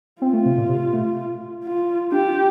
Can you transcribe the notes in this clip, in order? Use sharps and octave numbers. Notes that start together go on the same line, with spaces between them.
C4 F4
A3
C3
A#2
C3
A3
F4
D4 G4
F4